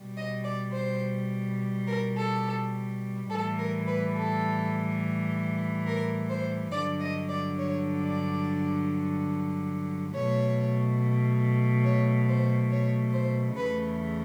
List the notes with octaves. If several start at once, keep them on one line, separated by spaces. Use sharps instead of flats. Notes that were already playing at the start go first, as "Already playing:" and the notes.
Already playing: B2 G3
D#5
D5
C5
A#4
A4
A2 E3 G3 A4
A#4
B4
A4
A#4
C5
G2 D3 F#3 D5
D#5
D5
C#5
D5
B2 F#3 A3 C#5
C#5
C5
C#5
C5
E2 C#3 E3 A3 B4